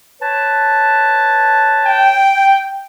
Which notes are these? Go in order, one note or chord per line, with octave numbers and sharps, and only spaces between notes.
B4 C#5 A5
G5